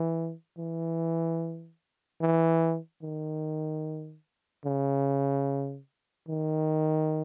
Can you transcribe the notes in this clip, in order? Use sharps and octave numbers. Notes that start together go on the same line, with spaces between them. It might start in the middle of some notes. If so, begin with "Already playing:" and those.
Already playing: E3
E3
E3
D#3
C#3
D#3